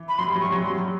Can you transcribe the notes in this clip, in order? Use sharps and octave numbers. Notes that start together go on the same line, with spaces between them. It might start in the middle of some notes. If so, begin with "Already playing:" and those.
Already playing: E3
B5
F#3 C6
G3
F#3
C#6
G3
F#3
G3 C6
F#3
G3